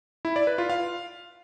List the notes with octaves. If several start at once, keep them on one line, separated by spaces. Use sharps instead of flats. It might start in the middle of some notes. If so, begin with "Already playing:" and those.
E4
D5
B4
F4
F5